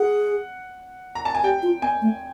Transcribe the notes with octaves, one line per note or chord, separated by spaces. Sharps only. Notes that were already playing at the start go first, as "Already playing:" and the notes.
Already playing: G#4 F#5
A#5
A5
G#5
G4 G5
F4
B3 G#5
A3